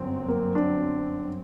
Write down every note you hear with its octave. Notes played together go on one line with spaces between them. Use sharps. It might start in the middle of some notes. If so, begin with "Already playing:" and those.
Already playing: G1 F#2 F#3 C4
A#3
D4